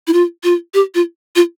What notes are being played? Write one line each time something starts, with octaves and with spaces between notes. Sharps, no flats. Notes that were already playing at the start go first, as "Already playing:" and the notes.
E4
F4
F4
G4
F4
F4